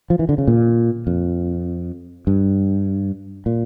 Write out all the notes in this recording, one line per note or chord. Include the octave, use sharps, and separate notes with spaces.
F3
E3
D3
C#3
A#2
F2
G2
A#2